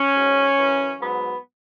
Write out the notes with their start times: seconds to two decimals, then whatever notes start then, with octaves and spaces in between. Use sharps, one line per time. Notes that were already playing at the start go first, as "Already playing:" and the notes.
Already playing: C#4
0.13 G#2 F#3
0.56 F#2 E3
0.99 G#2 F#3 B3